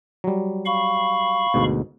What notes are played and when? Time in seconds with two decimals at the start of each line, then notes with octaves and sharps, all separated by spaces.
0.24 F#3 G3
0.66 F5 B5 C#6
1.54 D2 G#2 B2